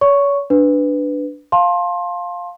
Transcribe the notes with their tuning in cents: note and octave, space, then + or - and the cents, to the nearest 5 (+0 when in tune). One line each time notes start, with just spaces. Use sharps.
C#5 +35 C#6 +0
D4 +0 B4 +10
F5 +10 A5 +0 C6 +20